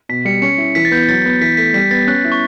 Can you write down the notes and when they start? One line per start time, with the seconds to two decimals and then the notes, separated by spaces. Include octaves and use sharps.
0.09 B2 B6
0.25 G3 C#7
0.42 C#4 C#7
0.58 E4
0.75 E3 B6
0.85 A6
0.91 B3 G6
1.09 F#3 A6
1.25 B3
1.41 E3 B6
1.57 A3 B6
1.74 G3 B6
1.91 B3 A6
2.07 C#4 F#6
2.24 E4
2.32 C#6